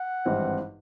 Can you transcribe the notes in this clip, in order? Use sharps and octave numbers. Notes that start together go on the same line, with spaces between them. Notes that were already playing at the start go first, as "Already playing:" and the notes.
Already playing: F#5
G#1 G2 E3 G3 C4